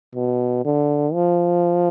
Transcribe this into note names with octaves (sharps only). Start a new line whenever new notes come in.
B2
D3
F3